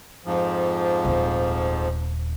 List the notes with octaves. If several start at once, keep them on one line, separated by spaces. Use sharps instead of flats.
F2 G#2 F3
D#1 C4